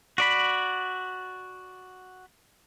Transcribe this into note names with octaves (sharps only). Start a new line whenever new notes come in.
F#4 D5 B5